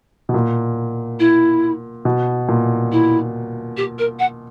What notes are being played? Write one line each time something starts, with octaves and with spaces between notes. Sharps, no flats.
B2
A#2
E4
B2
A#2
E4
G4
A#4
F#5